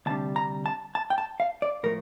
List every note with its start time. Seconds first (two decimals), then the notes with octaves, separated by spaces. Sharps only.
0.06 D2 C3 G3 D4 A5
0.36 A#5
0.66 A5
0.95 A5
1.10 G5
1.18 A5
1.40 F5
1.62 D5
1.83 A2 F3 A3 A#4